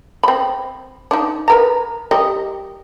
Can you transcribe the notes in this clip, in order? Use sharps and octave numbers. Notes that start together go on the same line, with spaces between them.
C4 B5
D4 D#4
A#4 B4 A#5
G3 A#4 D#5